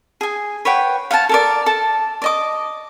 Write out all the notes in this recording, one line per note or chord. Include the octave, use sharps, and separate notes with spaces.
G#4 G#5
B4 C#5 F#5 G5
F5 F#5 G#5 A5
A4 A#4 D5
A4 A5
D5 D#5 D6